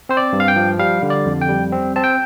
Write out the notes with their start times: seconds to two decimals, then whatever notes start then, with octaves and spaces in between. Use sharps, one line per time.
0.09 C4 C5
0.17 D5
0.33 G2
0.40 F5
0.48 G5
0.56 F3
0.79 G3 F5
1.03 D3
1.10 D5
1.26 F2
1.41 G5
1.49 G3
1.72 C4
1.96 C4 A5
2.04 G5